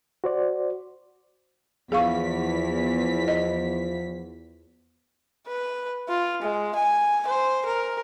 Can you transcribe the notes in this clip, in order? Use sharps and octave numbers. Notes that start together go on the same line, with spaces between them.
F#4 C5 D5
E2 F3 G#4 F5 C#6 B6
D#5
B4
F4
G#3
G#5
C5
A#4